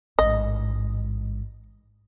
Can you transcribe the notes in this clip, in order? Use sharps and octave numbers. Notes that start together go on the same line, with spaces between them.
A1 G#2 D#5